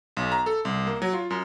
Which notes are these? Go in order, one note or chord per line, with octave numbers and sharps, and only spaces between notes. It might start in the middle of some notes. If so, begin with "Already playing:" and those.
B1
A#5
A4
C2
A#3
F#3
F4
F#2